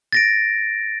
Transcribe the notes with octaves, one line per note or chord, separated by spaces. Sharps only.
A6 A#6 D7